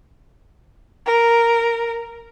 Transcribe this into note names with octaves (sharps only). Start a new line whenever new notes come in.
A#4